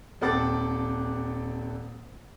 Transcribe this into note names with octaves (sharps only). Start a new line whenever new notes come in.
D#1 C4 A4 F#5 D6 A6